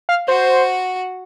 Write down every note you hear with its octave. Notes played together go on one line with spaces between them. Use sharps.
F5
F#4 C5